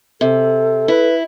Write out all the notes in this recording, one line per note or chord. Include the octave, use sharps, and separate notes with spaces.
C3 A4
E4 B4